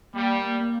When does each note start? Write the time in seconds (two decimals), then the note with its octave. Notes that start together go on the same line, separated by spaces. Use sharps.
0.14 G3 A#3
0.60 A#3